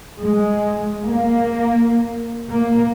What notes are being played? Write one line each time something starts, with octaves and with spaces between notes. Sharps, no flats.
G#3
A#3
A#3